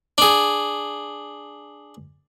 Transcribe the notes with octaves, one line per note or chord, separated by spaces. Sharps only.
D4 G#4